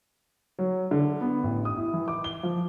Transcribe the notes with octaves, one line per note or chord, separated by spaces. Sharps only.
F#3
D3
B3
A1
D#6
E4
E3
D6
G7
F3